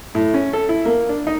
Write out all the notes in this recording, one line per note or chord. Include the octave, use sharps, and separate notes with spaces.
A2
C#4
A4
E4
A#3
D4
D#4